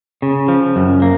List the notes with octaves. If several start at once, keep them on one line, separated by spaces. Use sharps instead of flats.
C#3
F3
F#2
A#3